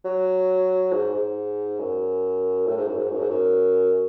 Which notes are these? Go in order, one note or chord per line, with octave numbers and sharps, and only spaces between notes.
F#3
G#2
G#2
F#2
A2
G#2
F#2
G#2
F#2
G#2
F#2